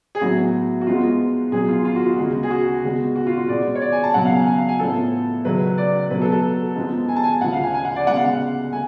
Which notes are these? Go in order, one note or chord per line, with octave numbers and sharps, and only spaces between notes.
G#4
A2 F#3 B3 F#4
F#4
G#2 F3 G#3 B3 F4
B2 F#3 B3 G#4
F4
F4
F#4
F4
D2 C#3 G#3 B3 F#4
G#4
F#4
C#2 C#3 G#3 B3
F#4
F4
F#4
B2 G#3 B3 D5
C#5
D5
G#5
A5
C#2 B2 F#3 B3 F#5
F5
G#5
G#5
F5
G#5
A2 F3 B3 A4
C#2 C#3 F#3 A3 B4
D5
B2 F#3 A3 B4
A4
A4
G#2 F3 G#3 B3
G#5
A5
G#5
D2 C#3 F3 F#5
F5
G#5
G#5
F#5
D5
D2 C#3 G#3 B3 F#5
F5
F#5
A3 G#5